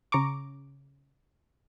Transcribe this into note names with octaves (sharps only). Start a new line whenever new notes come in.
C#3 A#5 C#6 D6